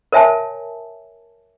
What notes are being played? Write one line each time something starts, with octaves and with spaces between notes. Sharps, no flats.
A#4 C#5 E5 G#5 A5